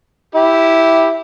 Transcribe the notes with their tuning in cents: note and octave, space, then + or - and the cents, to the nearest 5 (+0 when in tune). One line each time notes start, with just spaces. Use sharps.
E4 -5 G4 +0